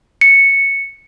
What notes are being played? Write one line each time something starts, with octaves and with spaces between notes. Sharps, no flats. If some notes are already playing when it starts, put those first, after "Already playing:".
C#7